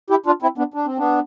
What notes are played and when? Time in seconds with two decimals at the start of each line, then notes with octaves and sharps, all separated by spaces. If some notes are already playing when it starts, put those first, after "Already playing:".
0.10 E4 G4
0.26 D4 F4
0.42 C4 E4
0.58 B3 D4
0.74 D4
0.86 C4
0.98 B3 D4